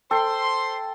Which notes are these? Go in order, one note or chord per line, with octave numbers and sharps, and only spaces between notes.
A4 C5 G5 C6